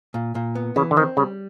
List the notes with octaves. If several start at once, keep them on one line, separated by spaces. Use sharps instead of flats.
A#2
A#2
B3
C#3 E3
D3
D#3 C4
C#3 G3